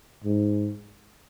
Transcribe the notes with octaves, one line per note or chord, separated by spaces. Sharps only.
G#2